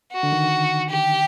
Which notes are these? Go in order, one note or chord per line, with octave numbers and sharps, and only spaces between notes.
F#4
D3
D#3
G4